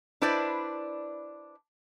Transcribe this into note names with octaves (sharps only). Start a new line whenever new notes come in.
D4 E4 B4 C5 D5